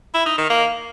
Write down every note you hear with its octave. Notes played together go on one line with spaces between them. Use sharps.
E4
D#4
D#3
A#3